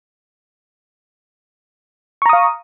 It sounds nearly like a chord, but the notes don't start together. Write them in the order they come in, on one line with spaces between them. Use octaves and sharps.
C#6 A#5 D#6 F5